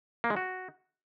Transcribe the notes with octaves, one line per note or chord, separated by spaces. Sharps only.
A#3
G#3
F#4